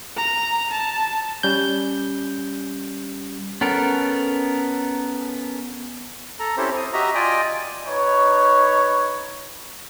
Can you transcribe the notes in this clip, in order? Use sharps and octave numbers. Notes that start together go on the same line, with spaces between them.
A#5
A5
G3 C#4 G6
B3 C#4 A4 A#4
A4 A#5
C4 C#4 E4 G4 A4 C5
D#6
F#4 G4 D#5 E5 A#5
F4 D5 D#5 G5 G#5
D#4 B4 C#5